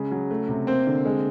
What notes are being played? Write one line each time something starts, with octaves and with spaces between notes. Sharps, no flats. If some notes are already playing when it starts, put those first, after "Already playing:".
Already playing: C#3 G#3
F#3
A3
C3
A#3 C4 C5
D3
G#3